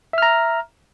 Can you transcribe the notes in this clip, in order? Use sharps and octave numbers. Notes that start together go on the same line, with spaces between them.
E5 A#5 F6